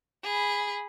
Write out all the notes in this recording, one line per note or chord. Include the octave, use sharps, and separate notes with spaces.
G#4 B5